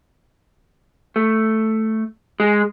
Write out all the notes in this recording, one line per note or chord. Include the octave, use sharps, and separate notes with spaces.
A3
G#3